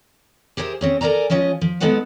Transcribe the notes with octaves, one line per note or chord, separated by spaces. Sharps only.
G4 G#4 A#4 C5 E5
C4 C#4 G#4
A4 A#4 C#5 D5 G#5 A#5
F3 G#3 C#4 F4 D#5
F3
G#3 B3 D#4 A4 B4 F#5